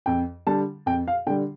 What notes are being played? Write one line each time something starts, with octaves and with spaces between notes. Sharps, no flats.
F2 G5
D3 G3 A5
F2 G5
F5
D3 G3 G5